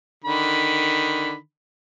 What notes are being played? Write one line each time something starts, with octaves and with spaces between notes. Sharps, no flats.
D3 D#3 B5